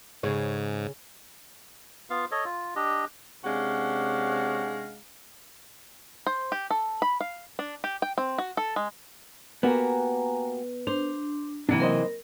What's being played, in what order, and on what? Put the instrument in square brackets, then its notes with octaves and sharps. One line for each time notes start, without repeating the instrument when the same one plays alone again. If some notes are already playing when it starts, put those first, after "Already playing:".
[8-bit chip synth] G#2 [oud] C#3 G#4 C#5
[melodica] B3 F4 F5
A4 C#5 D#5
F4
D4 G4 D#5
[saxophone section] C3 G#3 C#4 D4 F5 F#5
[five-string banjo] C5
G4
A4
B5
F5
D4
G4
G5
C4
F#4
A4
G#3
[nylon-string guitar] A#3 F#4 G4 [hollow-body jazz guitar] B3 [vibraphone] G#5 A#5
[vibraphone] D4 [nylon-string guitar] C5
[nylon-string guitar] C3 E3 [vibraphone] F#3 A#3 B5 [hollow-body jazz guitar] D4
[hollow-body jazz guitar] B1 C5 D#5 [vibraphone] A#4